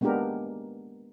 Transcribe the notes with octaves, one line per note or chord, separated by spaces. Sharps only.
G#3 A#3 B3 D4 G4 A#4